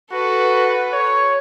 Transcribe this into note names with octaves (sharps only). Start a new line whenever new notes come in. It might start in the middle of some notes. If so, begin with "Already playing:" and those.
F#4 A4 B4
C#5